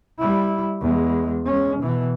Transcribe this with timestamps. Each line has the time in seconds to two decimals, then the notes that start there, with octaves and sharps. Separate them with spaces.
0.19 G3 E4
0.81 E2 G#3
1.46 G#3 C#4
1.80 B2 E3